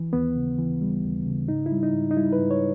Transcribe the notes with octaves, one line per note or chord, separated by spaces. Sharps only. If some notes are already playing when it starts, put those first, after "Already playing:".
Already playing: E3
D#2 B3
C#3
E3
G3
D#2
C#3
G#2 D#4
E4
G3
D#4
G#2
D#4
G3 E4
B4
G#2
C#5